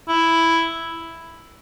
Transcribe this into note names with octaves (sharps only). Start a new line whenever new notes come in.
E4